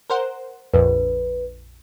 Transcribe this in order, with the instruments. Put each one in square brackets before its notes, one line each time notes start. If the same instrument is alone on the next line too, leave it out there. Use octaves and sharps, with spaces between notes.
[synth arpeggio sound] A#4 C5 F#5
[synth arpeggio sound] A#1 F2 [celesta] B4